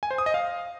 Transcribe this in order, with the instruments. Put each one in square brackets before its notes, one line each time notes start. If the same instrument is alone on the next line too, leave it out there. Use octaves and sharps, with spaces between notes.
[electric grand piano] G#5
C5
D#6
D#5
F5